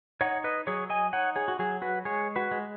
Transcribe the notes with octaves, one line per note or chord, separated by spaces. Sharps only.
D#4 C#5 F#5
B4 D#5
F#3 G#4 C#5
D#5 G#5
D#4 C#5 F#5
G#4 C#5
F#4
F#3 G#4
F#4 B4
G#3 G#4 C#5
F#4 B4
G#3